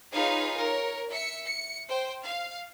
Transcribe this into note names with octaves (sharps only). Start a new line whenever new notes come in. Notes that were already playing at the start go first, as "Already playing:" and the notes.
D#4 F4 G#4 B4 C#5 F5
A#4 C#5
E5 C#7
C#7
C5 G5
F5